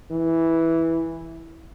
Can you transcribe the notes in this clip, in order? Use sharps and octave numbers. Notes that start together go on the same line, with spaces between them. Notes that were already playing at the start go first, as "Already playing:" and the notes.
E3